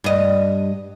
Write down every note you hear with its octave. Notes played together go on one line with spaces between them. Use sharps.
G2 D#5